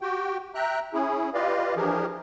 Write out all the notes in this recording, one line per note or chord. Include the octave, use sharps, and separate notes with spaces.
F#4 G4 G5
E5 G5 A#5 F#6
C#4 E4 G#4
F4 G4 B4 D5 D#5 F5
E3 F3 D4 G4 G#4 A#4